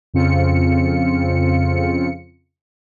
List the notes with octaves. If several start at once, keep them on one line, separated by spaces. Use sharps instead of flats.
F2 C#3 C4 F4 C#7